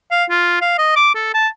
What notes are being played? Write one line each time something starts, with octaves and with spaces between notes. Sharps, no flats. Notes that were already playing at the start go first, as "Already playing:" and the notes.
F5
F4
F5
D#5
D6
A4
A5